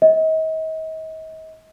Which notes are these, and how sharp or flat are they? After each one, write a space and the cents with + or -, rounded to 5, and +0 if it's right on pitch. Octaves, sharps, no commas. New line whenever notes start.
D#5 +40